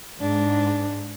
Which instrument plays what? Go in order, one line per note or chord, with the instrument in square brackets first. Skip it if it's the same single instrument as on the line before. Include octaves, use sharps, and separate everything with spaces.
[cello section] G#2 [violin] D4